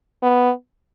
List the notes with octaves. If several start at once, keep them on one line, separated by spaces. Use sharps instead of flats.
B3